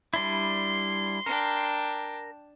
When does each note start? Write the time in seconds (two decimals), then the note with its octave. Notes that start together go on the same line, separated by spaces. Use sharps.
0.14 G3 D4 E4 C6
1.26 D4 A#4 G5